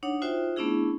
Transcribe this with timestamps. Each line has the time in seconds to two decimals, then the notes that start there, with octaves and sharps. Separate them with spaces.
0.03 D4 D#4 C#5 F#5 D#6
0.22 D#4 F4 F#4 C5 E5 G5
0.56 A3 B3 C#4 D4 E4 G#4